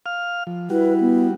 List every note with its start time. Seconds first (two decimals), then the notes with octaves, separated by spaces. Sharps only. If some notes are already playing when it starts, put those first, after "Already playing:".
0.06 F5 F6
0.47 F3
0.70 G3 E4 F#4 B4
1.00 B3